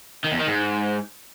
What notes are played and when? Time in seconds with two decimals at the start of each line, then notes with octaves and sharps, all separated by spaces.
0.24 D#3
0.32 E2
0.39 D#3
0.47 G#2